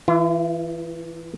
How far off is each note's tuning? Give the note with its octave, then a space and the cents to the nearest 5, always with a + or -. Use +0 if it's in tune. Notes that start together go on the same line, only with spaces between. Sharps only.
E3 +0 F4 -45